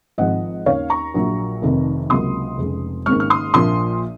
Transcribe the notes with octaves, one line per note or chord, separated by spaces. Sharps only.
G#1 G#2 F3 C4 D#5 F#5
D#2 D#3 A#3 C#4 C#5 F5
A#5 C#6
A#1 A#2 F#3
F1 F2 C3 D#3
C#2 C3 F#3 A#3 C6 D#6
F1 F2 C#3 G#3
G#1 G#2 D#3 A#3 C#4 C#6 F6
F6
C6 D#6
A#1 A#2 F3 A#3 C6 D#6